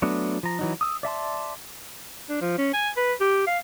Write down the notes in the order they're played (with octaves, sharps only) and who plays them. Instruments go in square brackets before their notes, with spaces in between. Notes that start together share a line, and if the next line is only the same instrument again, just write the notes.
[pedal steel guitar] F#3 A3 B3 D4
F3 A#5
E3 F#3 D#4
D#6 E6
D5 E5 A5 C6
[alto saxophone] D4
F3
C#4
G#5
B4
G4
F5